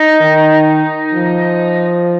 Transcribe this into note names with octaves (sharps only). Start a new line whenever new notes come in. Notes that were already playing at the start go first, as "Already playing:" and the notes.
Already playing: D#4
D#3
F3